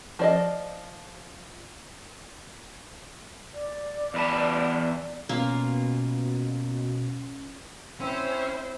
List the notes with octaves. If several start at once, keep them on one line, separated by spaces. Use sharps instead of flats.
F3 D5 D#5
D5
E2 B4 A5
B2 A#3 C#4 F4
C4 C#4 E4 C5